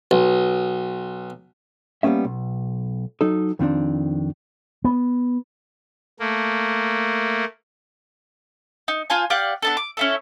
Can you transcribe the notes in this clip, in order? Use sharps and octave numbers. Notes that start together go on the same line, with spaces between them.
B1
G3 A#3 B3 C#4 E5
B1
F#3 D#4 A4
F2 D#3 C4 D4
B3
A3 A#3
D#4
F4 C5 G#5 A5
G4 D5 F5 F#5
B3 D4 A4
D6
C#4 E4 A4